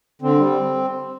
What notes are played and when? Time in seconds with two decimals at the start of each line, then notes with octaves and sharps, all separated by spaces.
0.22 D3 C4
0.37 G3